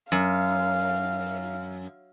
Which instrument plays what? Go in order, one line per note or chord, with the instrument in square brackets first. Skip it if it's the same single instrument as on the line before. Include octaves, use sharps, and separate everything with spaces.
[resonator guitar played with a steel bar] F#2 [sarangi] F5